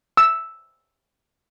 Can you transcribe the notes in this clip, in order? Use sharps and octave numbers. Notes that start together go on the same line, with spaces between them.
E6